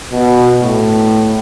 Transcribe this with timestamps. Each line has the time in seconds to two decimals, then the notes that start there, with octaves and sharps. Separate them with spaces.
0.13 B2
0.60 A2